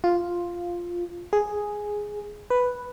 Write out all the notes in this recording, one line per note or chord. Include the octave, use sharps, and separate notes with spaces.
F4
G#4
B4